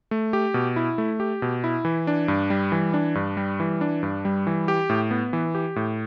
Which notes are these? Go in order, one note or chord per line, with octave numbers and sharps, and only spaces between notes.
A3
G4
B2
E4
A3
G4
B2
E4
E3
D4
G2
G3
E3
D4
G2
G3
E3
D4
G2
G3
E3
G4
A2
B3
E3
G4
A2